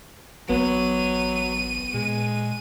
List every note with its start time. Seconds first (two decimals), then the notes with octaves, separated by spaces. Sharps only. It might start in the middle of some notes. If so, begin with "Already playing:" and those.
0.49 A1 F#3 B3 D#7
1.94 A#2 G#3